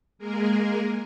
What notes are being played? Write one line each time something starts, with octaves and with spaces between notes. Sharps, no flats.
G#3 A#3 G#4 A#4